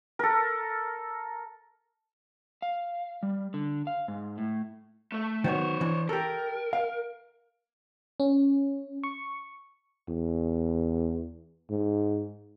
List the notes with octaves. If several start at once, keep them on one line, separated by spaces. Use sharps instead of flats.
A4 A#4
F5
G3
D3
F5
G#2
A2
A3 A4
D#3 F#3 B3 C5 C#5
E3 D4
G4 A4 A#4
F5
C#4
C#6
E2
G#2